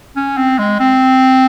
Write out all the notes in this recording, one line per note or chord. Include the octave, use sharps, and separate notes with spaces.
C#4
C4
G#3
C4